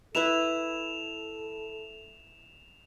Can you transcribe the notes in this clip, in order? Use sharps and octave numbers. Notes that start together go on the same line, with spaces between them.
E4 A4 B4 E5 E7 F7